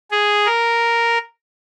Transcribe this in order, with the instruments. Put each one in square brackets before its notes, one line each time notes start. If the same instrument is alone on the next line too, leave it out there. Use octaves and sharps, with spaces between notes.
[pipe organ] G#4
A#4